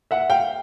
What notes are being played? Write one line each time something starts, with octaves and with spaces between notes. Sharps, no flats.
E5 F#5
F5 G5